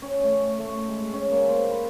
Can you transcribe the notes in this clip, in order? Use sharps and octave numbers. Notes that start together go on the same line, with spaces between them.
C#4
A3
A3
G#3
C#4
A#3
C5
B5